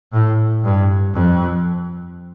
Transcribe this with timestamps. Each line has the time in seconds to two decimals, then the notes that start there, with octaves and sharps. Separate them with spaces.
0.13 A2
0.64 G2
1.13 F2